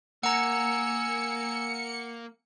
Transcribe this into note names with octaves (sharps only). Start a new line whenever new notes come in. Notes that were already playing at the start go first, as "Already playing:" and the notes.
A#3 F#5 G#5 A#5 E6 C#7